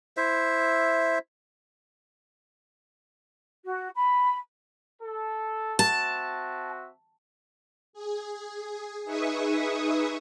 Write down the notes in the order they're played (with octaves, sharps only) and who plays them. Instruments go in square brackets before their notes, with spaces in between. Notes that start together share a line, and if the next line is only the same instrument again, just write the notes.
[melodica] E4 C5 E5
[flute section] F#4
B5
[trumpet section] A4
[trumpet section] C4 F#4 E5 [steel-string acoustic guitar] A5
[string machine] G#4
D#4 G#4 B4 E5 C#6 D#6